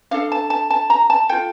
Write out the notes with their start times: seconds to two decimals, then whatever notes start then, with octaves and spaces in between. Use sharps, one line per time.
0.11 D4 A4 F5
0.32 A5
0.50 A5
0.70 A5
0.90 A#5
1.10 A5
1.29 F4 A4 G5